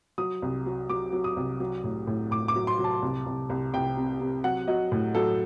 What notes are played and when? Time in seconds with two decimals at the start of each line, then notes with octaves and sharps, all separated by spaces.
0.18 F#3 D#6
0.42 C2
0.66 F#3
0.90 F#3 D6
1.12 F#3
1.24 D#6
1.37 C2
1.60 F#3
1.84 A2
2.07 A2
2.31 A2 D6
2.48 D6
2.56 F#3
2.67 C6
2.79 F#3
2.84 A5
3.02 C2
3.26 C2
3.50 C2
3.74 C2 G5
3.97 C3
4.21 C3
4.44 F#3 F#5
4.68 F#3 D#5
4.92 A2
5.15 F#3 A4